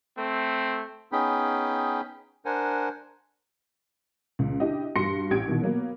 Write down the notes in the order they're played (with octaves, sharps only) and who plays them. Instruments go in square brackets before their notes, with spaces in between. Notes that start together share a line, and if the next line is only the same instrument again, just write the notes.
[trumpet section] A3 C4
[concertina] B3 C#4 D#4 G#4 G5 B5
D4 A#4 C5 F#5 G#5
[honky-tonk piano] C#2
D4 E4 G4 D#5
G2 F#4 C6 A#6 C#7
A1 G4 G#6 D7
B2 D#3 E3
F#3 A#3 B3